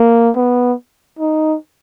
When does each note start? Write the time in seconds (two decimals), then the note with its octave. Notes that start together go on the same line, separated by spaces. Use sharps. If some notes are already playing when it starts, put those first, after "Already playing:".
Already playing: A#3
0.36 B3
1.19 D#4